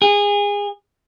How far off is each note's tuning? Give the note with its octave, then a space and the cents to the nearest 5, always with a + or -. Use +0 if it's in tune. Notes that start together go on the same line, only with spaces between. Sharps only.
G#4 -25